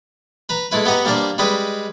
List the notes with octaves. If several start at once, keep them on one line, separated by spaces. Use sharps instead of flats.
B4 A#5
G#3 A3 E4 B4
B3 G4 D#5 F#5 A#5
G3 A#3 D4 A#4 C5 D5
G3 G#3 B4 D#5 G5